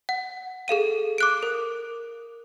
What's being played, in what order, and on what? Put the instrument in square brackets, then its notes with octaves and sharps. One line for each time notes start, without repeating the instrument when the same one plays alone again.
[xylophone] F#5
G#4 A4 F5 D#7
D6 F#6 D7
A#4